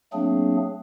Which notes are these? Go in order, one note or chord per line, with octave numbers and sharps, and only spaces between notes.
F#3 A3 A#3 C4 D4 G#4